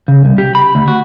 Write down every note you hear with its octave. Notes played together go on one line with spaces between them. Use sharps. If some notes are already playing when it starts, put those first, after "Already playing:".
C#3
C2
G4
B5
D2
F#4